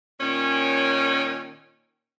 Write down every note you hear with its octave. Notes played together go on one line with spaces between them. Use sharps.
A#2 D#3 C#4